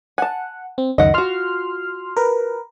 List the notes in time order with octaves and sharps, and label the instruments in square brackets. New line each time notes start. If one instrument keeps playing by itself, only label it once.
[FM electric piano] F#5 [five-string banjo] G#5 A5
[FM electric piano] C4
[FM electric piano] C#2 F#2 D#3 [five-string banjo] D#5 F#5
[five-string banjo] F4 F#4 [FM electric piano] C6 F6
[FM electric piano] A#4 B4